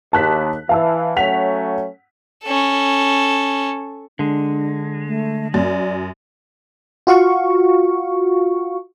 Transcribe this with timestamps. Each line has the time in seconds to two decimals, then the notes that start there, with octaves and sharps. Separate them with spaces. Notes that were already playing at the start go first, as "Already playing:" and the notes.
0.13 D#2 A5 F#6 B6
0.69 E3 F5 A5 E6
1.16 F#3 A3 C#4 F#5 B6 F7
2.44 C#4 A4
4.19 D3 G#3 D4
5.06 A3
5.54 F#2 D5
7.07 F4 F#4 F5 C#6